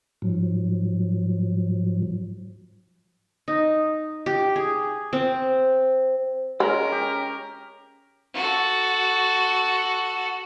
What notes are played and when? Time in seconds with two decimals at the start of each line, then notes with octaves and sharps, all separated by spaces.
0.22 G#2 F3 F#3
3.48 D#4
4.26 G4
4.56 G#4
5.13 C4
6.60 G#3 C#4 A#4
6.92 G4
8.34 F#4 A4